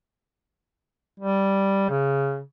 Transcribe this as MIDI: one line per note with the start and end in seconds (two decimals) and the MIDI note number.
1.20 1.89 55
1.90 2.41 49